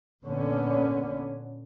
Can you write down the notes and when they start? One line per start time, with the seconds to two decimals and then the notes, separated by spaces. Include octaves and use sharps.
0.24 A#2 D3 B3 C#4